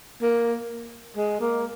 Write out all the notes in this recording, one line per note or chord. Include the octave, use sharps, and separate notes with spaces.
A#3
G#3
A#3